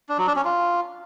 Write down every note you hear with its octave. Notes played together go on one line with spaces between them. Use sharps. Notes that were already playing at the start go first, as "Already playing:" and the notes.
D4
F#3
D4
C#4
F4